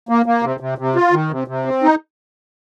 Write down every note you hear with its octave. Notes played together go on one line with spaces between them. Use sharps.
A#3
A#3
C3
C3
C3
F4
D#3
C3
C3
C4
D#4